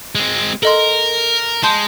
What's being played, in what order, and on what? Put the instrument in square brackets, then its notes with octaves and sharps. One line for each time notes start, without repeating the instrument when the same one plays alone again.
[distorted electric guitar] G#3 C4
[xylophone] A4 D#5 C6 [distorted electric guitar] A#4
[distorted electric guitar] G#3 [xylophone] A5 C6 G6